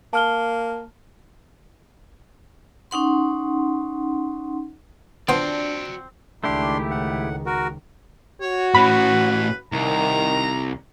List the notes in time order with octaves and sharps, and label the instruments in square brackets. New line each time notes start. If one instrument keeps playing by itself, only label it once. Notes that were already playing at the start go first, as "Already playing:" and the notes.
[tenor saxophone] A#3 [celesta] A5 F6 G7
[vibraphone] C#4 D#4 F#5 C6
[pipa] F3 C4 [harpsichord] B3 [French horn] D4 [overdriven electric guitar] F#4 D5
[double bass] C#2 D#3 [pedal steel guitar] A3 E4 G4 [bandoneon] D4 C6
[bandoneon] A2 F#5
F#4 A#4
[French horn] F#4 [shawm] C#5
[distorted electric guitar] A2 C#4 [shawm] B4 [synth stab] B5
[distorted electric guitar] C2 [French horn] D#3 [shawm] A#5